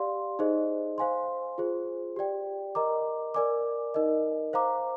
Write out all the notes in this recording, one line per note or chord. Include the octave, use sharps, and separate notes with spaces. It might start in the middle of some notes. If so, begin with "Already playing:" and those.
Already playing: G4 D5 F5 C6
D#4 G#4 C5 D#5
C5 F5 G#5 C6
F4 G#4 C5
G4 D5 G5
A#4 D#5 A#5 D6
A#4 D5 G#5 D6
D#4 A#4 D#5
C5 F5 A#5 D6